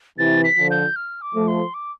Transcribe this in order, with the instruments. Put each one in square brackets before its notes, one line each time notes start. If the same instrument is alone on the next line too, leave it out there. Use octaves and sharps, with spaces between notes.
[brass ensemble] C3 E3 [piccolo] A6
[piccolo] B6
[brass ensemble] D3 F3
[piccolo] G6
F6
D6
[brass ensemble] F3 A3
[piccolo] C6
D6